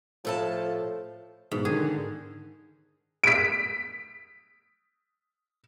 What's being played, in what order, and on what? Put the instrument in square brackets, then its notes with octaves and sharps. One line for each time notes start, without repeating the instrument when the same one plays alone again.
[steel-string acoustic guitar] A2 A4 A5 [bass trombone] F3
[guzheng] G#2 [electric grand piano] B2
[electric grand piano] D3 D#3 [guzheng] G#4
[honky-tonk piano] B6 D7